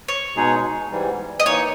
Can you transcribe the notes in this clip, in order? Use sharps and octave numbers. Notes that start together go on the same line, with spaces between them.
C#5
B2 G#3 D#4 G#4
G#2 E3 G3
D#5
E3 A#3 D#4 C#5